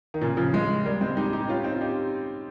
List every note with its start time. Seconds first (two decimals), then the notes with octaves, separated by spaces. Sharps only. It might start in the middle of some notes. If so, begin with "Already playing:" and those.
0.14 D#3
0.21 A#2 C#3
0.37 C#3 F3
0.53 F3 G#3
0.85 G3 A#3
1.01 G#3 C4
1.17 D#4 G4
1.33 D#4 G4
1.48 C#4 F4
1.64 C4 D#4
1.75 F4
1.81 D#4 G4